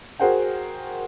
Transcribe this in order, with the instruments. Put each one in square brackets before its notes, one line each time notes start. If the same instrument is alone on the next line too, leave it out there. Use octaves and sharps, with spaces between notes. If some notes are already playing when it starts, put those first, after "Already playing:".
[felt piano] F#4 G#4 A#4 C5 F#5 G5